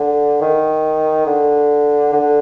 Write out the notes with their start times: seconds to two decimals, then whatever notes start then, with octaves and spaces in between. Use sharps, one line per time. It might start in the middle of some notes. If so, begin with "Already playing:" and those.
Already playing: D3
0.41 D#3
1.26 D3
2.13 D3